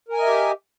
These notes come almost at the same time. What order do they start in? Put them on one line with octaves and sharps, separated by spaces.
A#4 G#5 D#5 E5 G4